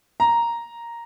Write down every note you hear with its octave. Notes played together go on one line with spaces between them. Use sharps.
A#5